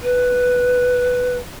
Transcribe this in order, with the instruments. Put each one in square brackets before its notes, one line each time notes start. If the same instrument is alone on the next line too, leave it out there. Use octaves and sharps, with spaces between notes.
[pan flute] B4